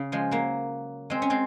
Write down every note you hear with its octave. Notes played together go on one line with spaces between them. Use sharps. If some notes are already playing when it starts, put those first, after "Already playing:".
Already playing: C#3
F3 G#3
F#3 A#3
G#3 C4
C#4
G#3 C4